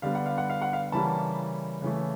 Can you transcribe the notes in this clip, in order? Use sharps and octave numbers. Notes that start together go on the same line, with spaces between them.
D3 G3 B3 F5
F#5
F5
F#5
F5
F#5
F5
C#3 E3 G3 A#3 A5 B5
C#3 E3 A3